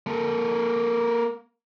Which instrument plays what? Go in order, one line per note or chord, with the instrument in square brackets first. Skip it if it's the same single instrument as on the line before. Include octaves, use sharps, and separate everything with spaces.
[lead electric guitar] A#3 A4